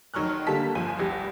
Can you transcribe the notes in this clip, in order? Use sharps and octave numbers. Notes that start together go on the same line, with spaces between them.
F1 D#3 F#3 C#6 F6 F#6
D3 G3 A#3 A5 B6
G1 F3 G#5 D#7
F1 C2 G4 A#6